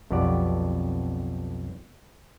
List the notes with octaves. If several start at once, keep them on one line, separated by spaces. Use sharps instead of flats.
B1 F2 B3 F#4 G4 D5